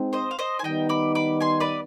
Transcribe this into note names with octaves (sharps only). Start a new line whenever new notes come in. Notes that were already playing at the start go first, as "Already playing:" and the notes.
Already playing: G#3 C4 D#4
C5 D#5
F5
C5 D#5
G#5
D#3 G3 B3 D#4 D#5 G5
B5 D6
B5 D6
G#5 C6
B4 D5